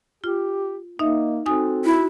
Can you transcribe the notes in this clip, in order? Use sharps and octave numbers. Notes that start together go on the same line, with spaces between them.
F4 G4
A#3 D#4 D#5 E5
C4 D#4 F#4 A4 G#5 D#6
D#4 E4 F#4